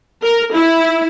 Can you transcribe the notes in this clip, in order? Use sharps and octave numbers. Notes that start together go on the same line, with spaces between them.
A#4
E4